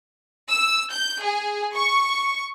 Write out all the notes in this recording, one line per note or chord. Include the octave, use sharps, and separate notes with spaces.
E6
G6
G#4
C#6